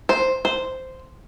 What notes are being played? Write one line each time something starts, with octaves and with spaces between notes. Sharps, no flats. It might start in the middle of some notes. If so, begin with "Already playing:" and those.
C5
C5